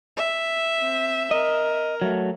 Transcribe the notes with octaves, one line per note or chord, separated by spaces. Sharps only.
E5
C4
A#4 D#5
F#3 A3